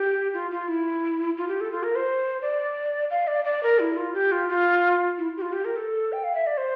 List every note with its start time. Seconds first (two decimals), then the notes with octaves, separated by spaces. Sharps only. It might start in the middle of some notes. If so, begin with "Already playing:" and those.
Already playing: G4
0.34 F4
0.51 F4
0.68 E4
1.37 F4
1.48 G4
1.61 A4
1.72 F4
1.83 A#4
1.96 C5
2.42 D5
3.10 F5
3.27 D5
3.45 D5
3.63 A#4
3.79 E4
3.97 F4
4.14 G4
4.32 F4
4.49 F4
5.18 E4
5.37 G4
5.42 F4
5.53 G4
5.65 A#4
5.76 A4
6.12 G5
6.24 F5
6.35 E5
6.47 D5
6.58 C5